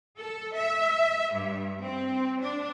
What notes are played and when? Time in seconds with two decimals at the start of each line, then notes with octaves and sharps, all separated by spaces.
0.19 A4
0.54 E5
1.34 G2
1.81 C4
2.41 D4